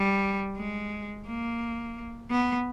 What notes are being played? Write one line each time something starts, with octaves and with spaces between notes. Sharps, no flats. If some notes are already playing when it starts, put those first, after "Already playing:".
Already playing: G3
G#3
A#3
B3